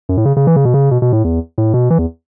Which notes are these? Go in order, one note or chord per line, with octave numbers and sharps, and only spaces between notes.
F#2
A2
C#3
C#3
E3
C#3
B2
C#3
B2
B2
A2
E2
A2
B2
E3
E2